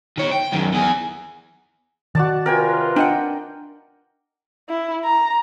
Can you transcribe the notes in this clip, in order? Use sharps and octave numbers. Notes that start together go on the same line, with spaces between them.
D#3 C#5
G5
F#2 D#3
E2 G#4
D#3 F#4 D5 A5
C3 F4 A#4 B4 G5 G#5
D4 D#5 F#5 G5
E4
A#5